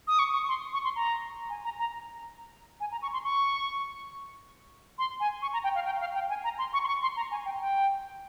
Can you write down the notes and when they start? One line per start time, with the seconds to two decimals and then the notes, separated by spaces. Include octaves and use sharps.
0.07 D#6
0.19 C#6
0.33 C#6
0.48 C6
0.73 C#6
0.84 C6
0.96 A#5
1.50 G#5
1.64 A#5
1.79 A#5
2.80 G#5
2.92 A#5
3.02 C#6
3.13 C6
3.24 C#6
4.98 C6
5.20 G#5
5.42 C#6
5.53 A#5
5.64 G5
5.75 F5
5.85 G5
6.00 F5
6.14 G5
6.29 G#5
6.44 A#5
6.58 C6
6.73 C#6
6.84 C6
6.87 C#6
7.02 C6
7.16 A#5
7.31 G#5
7.45 G5
7.60 G5